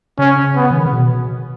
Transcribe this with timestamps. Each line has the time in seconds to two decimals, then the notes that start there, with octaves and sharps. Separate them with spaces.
0.19 C#3 C#4
0.56 B3
0.71 E3
0.78 D#3
0.86 C#3
0.93 B2